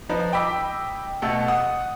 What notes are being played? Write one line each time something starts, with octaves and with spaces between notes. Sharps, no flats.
F3 D#4 B4
D#5 G5 B5 D6 E6 B6
B2 A3 A4
F#5 D#6